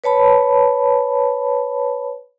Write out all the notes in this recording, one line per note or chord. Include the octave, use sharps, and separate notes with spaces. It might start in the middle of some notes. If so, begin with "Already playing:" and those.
B4 C#5 A5 B5